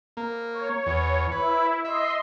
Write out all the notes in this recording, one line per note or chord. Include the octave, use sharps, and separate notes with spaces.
A#3
C#5
E2
E4 B4
D#5 E5 C6